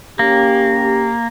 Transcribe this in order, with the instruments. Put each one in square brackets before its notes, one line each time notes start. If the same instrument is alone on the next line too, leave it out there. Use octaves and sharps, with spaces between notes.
[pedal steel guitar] A#3 [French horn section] C#4 G4